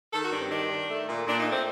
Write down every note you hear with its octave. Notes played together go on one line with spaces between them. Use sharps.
D#3 A4
F#4
G2 D4
C4
D#3 D4
D#3
A3
A#2
A#2 D4
D#4
A3
C4